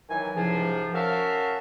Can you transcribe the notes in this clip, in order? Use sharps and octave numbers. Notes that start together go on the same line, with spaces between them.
D#3 E3 F#3 G#5
C#2 G#2 C3 F3
C#4 F#4 A#4 E5 F5 A5